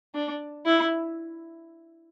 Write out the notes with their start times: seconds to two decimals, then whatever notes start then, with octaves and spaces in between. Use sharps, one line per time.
0.15 D4
0.66 E4